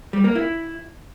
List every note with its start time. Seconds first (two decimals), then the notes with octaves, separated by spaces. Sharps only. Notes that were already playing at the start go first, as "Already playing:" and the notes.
0.13 G3
0.24 A#3
0.35 E4